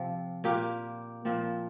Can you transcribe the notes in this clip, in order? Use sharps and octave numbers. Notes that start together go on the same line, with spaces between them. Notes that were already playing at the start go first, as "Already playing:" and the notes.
Already playing: C3 F3 C4 F4
A#2 A#3 G4
A#2 F3 C4